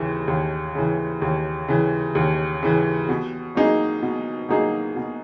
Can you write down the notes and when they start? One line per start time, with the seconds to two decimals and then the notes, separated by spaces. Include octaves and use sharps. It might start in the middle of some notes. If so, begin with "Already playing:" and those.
Already playing: D#2 C#3 E3
0.28 D#2
0.75 C#3 E3
1.22 D#2
1.68 C#3 E3
2.15 D#2
2.63 C#3 E3
3.09 B2
3.55 F#3 A#3 D#4 G#4
4.02 B2
4.49 F#3 A#3 D#4 G#4
4.96 B2